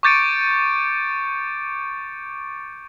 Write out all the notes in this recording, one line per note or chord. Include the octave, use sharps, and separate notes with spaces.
C#6 D6 G6 A6 C#7 D7